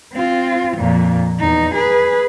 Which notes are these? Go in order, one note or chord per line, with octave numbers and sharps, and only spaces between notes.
C4 F4
F2 A#2
E2 D#4
G#4 B4